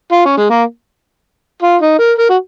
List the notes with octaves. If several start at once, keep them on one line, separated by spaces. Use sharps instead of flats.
F4
C#4
G#3
A#3
F4
D#4
A#4
A#4
F#4